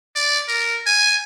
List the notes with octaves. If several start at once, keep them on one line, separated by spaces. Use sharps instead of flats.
D5
A#4
G#5